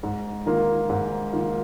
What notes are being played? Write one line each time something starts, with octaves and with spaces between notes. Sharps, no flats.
G#2
D#3 A#3 F4
G#2
D#3 A#3 F4